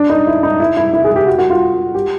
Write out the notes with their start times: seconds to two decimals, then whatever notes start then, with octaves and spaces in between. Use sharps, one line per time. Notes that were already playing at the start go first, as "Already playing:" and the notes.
Already playing: D4
0.10 D#4
0.27 E4
0.43 D#4
0.60 E4
0.77 E4
0.93 E4
1.04 G#4
1.16 G4
1.27 F#4
1.38 F#4
1.50 F4
1.95 G4